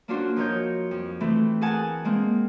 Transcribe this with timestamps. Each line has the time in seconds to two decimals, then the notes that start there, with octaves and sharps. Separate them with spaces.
0.08 A#3 C#4 D4 F4 F#4 C5
0.36 F3 D#4 A#4 C#5 G6
0.91 F2
1.20 E3 A3 C4
1.61 G#4 A#4 F#5 G#5 A5
2.05 G#3 A#3 C4